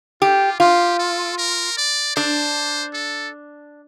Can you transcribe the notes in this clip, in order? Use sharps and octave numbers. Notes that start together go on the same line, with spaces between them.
F4 G4
F4 G4
A4
A#4
D5
D4 C5
A4